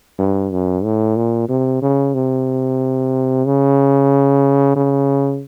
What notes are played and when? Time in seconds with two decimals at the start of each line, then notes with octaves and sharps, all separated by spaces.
0.19 G2
0.52 F#2
0.84 A2
1.17 A#2
1.49 C3
1.82 C#3
2.14 C3
3.46 C#3
4.76 C#3